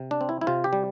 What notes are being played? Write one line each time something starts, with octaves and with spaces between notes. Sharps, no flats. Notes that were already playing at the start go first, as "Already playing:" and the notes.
Already playing: C3
D4
C4
E4
E4
C3 F4
G4
G3